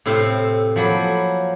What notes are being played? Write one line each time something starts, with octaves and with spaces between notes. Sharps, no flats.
A2 C3 C4 E5 F5 C6
F3 F#3 A#3 B5